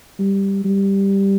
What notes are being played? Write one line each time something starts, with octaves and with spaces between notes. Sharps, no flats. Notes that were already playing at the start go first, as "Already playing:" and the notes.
G3
G3